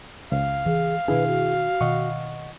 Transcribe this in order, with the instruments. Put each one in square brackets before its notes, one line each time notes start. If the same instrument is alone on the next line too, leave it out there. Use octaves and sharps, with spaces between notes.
[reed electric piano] C#2 [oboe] F5
[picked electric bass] E3 [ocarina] G#4
[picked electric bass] B2 D#3 D4 [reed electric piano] E4 G#4 [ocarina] B4
[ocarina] F#4
[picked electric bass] B2 D#3 [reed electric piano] D#5 F#5 C#6